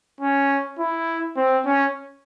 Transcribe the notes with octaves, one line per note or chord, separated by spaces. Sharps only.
C#4
E4
C4
C#4